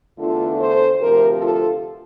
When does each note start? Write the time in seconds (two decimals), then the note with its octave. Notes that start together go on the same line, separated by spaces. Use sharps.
0.18 E2 D3 A3 D4 F4 A4
0.59 A4 C5
0.99 D2 C3 F3 G4 A#4
1.40 F4 A4